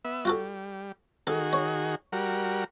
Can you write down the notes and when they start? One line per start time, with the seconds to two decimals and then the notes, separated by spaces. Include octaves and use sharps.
0.05 B3 E5
0.25 G3 F4 F#4 A4
1.27 D#3 F#4 G#4 A4
1.53 C#5
2.12 G3 F#4 A#4